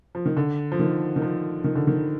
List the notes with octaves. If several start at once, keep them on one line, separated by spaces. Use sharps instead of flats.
F3
D#3
D3
F3
D#3
D#3
F3
D#3
D3
D#3